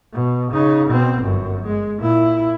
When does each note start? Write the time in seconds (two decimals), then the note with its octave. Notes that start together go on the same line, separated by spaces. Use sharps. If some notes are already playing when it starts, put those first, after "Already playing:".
0.13 B2
0.52 C#3 D#4
0.87 B2 C4
1.21 G1 F#2
1.66 G#3
1.99 A#2 E4